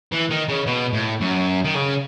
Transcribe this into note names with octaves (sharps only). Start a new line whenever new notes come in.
E3
D#3
C#3
B2
A2
F#2
D#3
C#3